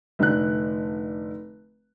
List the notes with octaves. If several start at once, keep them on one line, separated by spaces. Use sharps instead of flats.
F1 D3 D#4 F#6